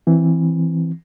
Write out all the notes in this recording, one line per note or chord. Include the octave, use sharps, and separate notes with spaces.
E3 C4